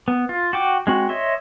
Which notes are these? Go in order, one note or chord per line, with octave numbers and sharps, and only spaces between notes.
B3
F4
F#4 G5 D6
G#3 C4 F#4
C#5 D#5 E5 C6